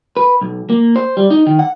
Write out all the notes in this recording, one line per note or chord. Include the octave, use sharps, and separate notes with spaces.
B4
B1
A#3
C5
G3
D#4
D#3
F#5